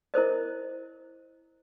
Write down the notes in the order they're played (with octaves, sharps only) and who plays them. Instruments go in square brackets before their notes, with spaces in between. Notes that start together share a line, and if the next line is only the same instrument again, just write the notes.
[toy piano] E4 A#4 C5 D#5